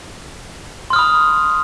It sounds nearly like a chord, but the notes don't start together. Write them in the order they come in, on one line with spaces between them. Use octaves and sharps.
C6 F6 D#6 B5